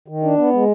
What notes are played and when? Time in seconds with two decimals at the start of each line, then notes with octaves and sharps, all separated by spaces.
0.08 D#3
0.23 D4
0.38 B3
0.53 G#3